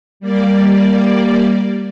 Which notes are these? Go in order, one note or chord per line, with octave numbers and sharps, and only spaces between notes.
G3 A#3 D5